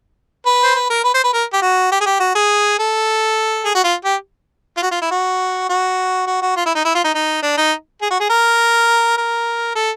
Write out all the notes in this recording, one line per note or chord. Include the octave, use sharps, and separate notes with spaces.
B4
C5
B4
A#4
B4
C5
B4
A#4
G4
F#4
G4
G#4
G4
F#4
G#4
A4
G#4
F#4
F4
G4
F4
F#4
F4
E4
F#4
F#4
F#4
F#4
F4
E4
D#4
E4
F4
D#4
D#4
D4
D#4
G#4
F#4
G#4
A#4
A#4
A4